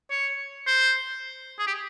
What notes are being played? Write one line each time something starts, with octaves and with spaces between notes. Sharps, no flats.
C#5
C5
G#4
G4